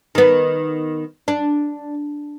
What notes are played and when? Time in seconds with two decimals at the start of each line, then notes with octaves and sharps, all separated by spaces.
0.15 D#3 B3
1.28 D4